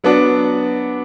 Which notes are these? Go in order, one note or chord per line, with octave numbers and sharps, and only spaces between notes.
F#3 B3 D4 F#4